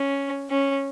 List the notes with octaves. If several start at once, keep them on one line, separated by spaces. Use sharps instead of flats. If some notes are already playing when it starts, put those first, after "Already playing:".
Already playing: C#4
C#4